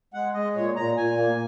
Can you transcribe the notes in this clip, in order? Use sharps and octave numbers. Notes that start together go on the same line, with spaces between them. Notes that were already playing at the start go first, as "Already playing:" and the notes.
G#3 F#5
G#3 D#5
A#2 C#5
A#2 A#5
A#2 G#5
A#3